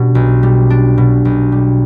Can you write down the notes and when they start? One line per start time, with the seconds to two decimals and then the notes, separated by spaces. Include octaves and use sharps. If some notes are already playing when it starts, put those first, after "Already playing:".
Already playing: B2 G3 D4
0.15 B1
0.43 G3
0.70 D4
0.98 B2
1.25 B1
1.52 G3